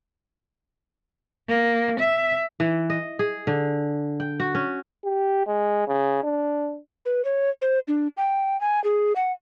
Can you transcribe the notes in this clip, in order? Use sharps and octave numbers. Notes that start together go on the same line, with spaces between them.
A#3
E5
E3
D#5
G#4
D3
G5
F#4
C#4
G4
G#3
C#3
D4
B4
C#5
C5
D4
G5
G#5
G#4
F#5